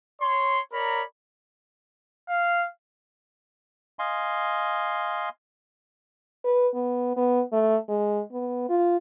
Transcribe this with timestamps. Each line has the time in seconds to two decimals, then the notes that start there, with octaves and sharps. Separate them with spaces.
0.21 C#5 C6
0.72 A#4 C#5 D5 A#5 B5
2.29 F5
3.99 D#5 F5 G#5 C6
6.44 B4
6.74 B3
7.16 B3
7.52 A3
7.89 G#3
8.32 B3
8.69 F4